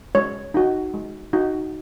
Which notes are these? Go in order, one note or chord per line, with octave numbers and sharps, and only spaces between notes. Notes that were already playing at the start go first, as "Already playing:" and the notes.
G#3 C#5
D#4 F#4
G#3
D#4 F#4